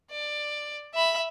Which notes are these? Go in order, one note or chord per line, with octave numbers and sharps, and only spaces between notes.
D5
E5 B5